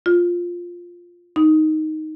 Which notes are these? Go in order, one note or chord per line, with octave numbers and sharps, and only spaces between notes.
F4
D#4